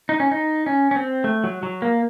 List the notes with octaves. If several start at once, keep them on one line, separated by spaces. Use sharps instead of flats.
D#4
C#4
D#4
C#4
C#4
C4
A3
F#3
F#3
A#3